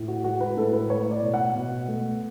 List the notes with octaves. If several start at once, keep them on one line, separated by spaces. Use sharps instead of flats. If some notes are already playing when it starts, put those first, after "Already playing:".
Already playing: A2
F#4
G#3 F#4
B4
A2 A4
B4
A3 C#5
D5
B2
F#5
B2
A3